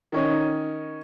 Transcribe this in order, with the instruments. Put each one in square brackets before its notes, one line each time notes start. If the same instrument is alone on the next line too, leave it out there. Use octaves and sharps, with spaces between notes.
[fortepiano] D#3 C#4 D#4